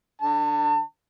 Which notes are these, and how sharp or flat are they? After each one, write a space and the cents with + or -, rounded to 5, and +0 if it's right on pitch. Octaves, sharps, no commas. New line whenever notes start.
D3 +0 A5 +35